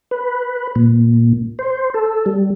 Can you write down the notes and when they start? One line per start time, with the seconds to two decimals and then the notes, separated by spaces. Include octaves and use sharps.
0.11 B4
0.76 A#2
1.59 C5
1.94 A4
2.26 G3